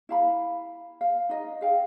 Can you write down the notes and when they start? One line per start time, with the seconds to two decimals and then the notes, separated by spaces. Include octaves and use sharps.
0.09 E4 F5 B5
1.01 F5
1.29 D#4 D#5
1.61 G#4 F5 G5